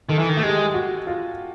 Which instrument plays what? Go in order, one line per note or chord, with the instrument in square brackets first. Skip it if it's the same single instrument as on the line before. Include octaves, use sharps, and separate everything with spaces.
[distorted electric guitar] D#3 [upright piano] A4
[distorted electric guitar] E3
D#3
A3
[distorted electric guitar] G#3 [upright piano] G4
[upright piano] F#4
F4